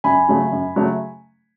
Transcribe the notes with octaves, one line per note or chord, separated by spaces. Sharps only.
F#2 G#5 B5
C#3 F#3 A3
F#2
C#3 F#3 A3